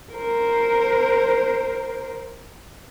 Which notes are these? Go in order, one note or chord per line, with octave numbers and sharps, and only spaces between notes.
A#4 C5